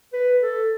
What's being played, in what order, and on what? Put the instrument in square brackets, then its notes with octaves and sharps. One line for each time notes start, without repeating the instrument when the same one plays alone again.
[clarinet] B4
A4